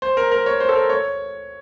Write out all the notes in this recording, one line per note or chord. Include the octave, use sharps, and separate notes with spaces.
C5
A#4
A#4
C#5
C5
A4
A#4
C#5